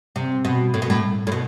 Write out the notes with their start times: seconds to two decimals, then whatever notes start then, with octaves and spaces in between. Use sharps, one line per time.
0.16 C3
0.45 B2
0.74 A2
0.82 B2
0.90 A2
1.27 A2
1.32 B2